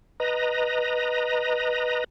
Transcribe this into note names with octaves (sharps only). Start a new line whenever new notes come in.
B4 D#5 A#5